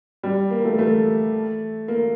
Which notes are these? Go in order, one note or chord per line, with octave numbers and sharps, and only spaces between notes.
G3
A#3
A3
A3
A#3